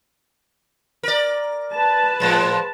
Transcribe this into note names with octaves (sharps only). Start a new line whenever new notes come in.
A#4 D5
B4 A5
A2 F3 G#3